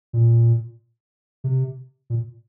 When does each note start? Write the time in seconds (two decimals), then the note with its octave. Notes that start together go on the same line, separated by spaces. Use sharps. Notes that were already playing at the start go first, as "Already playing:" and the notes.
0.13 A#2
1.44 C3
2.10 A#2